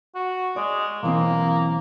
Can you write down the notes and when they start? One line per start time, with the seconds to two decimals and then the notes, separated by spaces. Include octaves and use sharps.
0.15 F#4
0.56 G#3 D5
1.03 B1 E3 A#3 C4